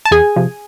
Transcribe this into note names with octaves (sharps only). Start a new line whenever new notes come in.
A5
E2 G#4 G#5
C3 F3